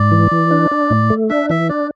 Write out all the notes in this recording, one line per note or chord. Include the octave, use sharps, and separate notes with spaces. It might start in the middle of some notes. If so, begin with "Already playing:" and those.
Already playing: G#2 D5
E3
E3
D4
D4
A2
A3
D4 E5
E3 E5
D4 D5